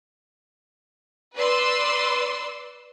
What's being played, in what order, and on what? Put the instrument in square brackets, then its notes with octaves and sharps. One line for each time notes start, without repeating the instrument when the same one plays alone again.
[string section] B4 D5 C6 E6